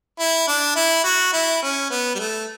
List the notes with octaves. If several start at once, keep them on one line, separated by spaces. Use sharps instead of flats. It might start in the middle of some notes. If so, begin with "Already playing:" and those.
E4
D4
E4
F#4
E4
C#4
B3
G3
A3